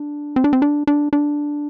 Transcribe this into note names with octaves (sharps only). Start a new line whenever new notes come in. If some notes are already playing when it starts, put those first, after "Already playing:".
Already playing: D4
C4
D4
C4
D4
D4
D4